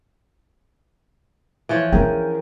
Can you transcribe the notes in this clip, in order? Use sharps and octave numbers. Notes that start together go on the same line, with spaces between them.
E3 F3 C#5
C#4 D4 G#4 A#4 G5